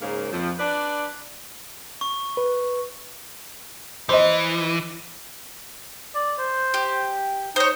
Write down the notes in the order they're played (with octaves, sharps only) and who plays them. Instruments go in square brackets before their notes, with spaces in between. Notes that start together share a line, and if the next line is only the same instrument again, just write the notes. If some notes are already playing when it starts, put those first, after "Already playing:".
[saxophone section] G#2 C#3 A#3
F2 F3
D4 B4 D5
[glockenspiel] C#6
[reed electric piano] B4
[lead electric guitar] E3 [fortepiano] C5 D#5
[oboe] D5
C5
[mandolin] G4
[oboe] D#4 [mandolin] C5 C#5